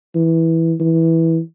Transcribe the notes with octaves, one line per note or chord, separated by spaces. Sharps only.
E3
E3